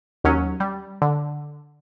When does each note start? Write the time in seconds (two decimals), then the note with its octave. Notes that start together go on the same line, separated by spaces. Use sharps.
0.24 D#2 F#3 C#4
0.60 G3
1.02 D3